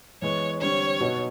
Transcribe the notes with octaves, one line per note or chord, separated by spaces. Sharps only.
E3 G#3 B3 C#5
D3 G3 C4 C#5
B2 F#3 B3 D#4 F#4